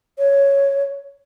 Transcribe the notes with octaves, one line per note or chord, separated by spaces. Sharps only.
C#5